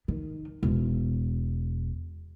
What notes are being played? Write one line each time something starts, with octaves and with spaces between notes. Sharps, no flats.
D#3
E1